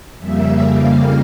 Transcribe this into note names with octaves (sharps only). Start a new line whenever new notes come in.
F2 C#3 G3 A#3 E5
F5